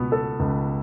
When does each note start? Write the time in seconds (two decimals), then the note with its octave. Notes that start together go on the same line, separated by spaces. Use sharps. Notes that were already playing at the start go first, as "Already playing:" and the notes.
Already playing: C#2 B2 B3
0.12 A4
0.40 C#2